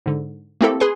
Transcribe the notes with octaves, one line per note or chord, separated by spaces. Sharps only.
G#2 D3
A3 A#3 C4 E4 G4 A4
G#4 B4 G#5 C6